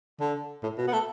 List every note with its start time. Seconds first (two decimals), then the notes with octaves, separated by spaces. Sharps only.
0.20 D3
0.63 A2
0.77 B2
0.87 B3
0.93 A3